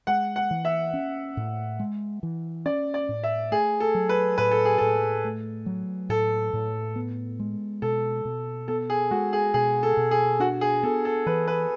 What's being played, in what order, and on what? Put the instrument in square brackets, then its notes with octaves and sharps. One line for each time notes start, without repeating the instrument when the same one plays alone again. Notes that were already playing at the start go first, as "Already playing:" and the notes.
[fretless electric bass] G#3 [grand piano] F#5
[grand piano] F#5
[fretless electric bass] E3
[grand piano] E5
[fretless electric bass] C#4
A2
G#3
E3
[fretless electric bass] C#4 [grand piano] D5
[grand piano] D5
[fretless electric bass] A2
[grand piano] E5
[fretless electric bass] A3 [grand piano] G#4
[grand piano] A4
[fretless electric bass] F#3
[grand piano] B4
[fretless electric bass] A2 [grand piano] B4
[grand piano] A4
G#4
[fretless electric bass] A2 [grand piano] A4
[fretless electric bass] A3
F#3
[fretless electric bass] A2 [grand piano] A4
[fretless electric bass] A2
B3
G#3
[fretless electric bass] B2 [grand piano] A4
[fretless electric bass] B2
[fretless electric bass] B3 [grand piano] A4
[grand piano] G#4
[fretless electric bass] G#3 [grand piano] F#4
[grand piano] G#4
[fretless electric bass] B2 [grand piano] G#4
[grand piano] A4
[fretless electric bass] B2
[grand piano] G#4
[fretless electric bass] D4 [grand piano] F#4
[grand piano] G#4
[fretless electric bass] B3 [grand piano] A4
[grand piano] A4
[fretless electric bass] E3 [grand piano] B4
[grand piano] B4